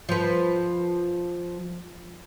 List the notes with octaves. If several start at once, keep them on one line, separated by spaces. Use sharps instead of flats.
F3 B4